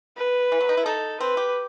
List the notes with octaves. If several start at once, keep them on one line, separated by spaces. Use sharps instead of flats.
B4
E3
F#3
D#4
E4
D#4 A4
C4 B4
G4